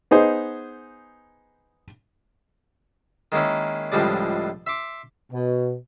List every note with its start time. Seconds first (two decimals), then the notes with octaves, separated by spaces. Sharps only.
0.11 B3 D#4 G#4 C5
3.32 D#3 G#3 A#3 C#4 E4
3.92 C#2 A2 F3 G3 G#3 D5
4.66 E5 C6 D6
5.32 B2